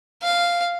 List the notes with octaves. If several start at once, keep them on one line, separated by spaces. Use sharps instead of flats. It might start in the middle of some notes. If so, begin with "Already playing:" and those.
F5